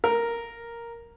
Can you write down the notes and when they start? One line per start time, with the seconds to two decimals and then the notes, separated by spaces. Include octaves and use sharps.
0.04 A#4